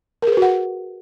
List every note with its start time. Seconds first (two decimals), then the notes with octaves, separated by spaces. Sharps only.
0.22 A#4
0.27 G#4
0.32 B4
0.37 F#4
0.42 F#5